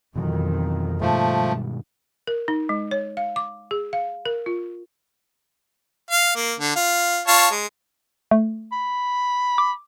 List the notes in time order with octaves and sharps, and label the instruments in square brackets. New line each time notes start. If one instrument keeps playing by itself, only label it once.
[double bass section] F2 D#3 [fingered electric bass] B2 E3 F#3
[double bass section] G2 [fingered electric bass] B2 D#3 G#3 [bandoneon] F3 A3
[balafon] A#4
D#4
G#3
C#5
F5
D6
G#4
F5
A#4
F4
[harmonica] F5
A#3
D3
F4
F4 C#5 A5
G#3
[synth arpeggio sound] A3
[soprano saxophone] B5
[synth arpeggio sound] D6